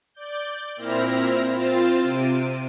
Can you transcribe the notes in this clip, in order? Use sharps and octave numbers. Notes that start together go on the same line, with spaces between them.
D5 G6
A#2 C4 E4 F6 A#6
C4 F4 A6 E7
C3 D7 D#7